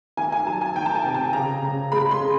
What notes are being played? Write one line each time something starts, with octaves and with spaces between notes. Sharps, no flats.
D#3 G#5
G#5
F#3 A5
G#5
D#3 G5
A5
G#5
C3
A5
C#3 A#5
C#3
G#3 B5
C6
C#3